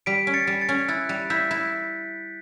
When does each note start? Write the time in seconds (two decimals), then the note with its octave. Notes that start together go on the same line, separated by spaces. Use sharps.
0.06 G3 B6 D7
0.27 C#4
0.34 A6 C#7
0.47 G3
0.61 A6 C#7
0.69 C#4
0.88 E4 F#6 A6
1.09 G3
1.30 E4 G6 B6
1.51 E4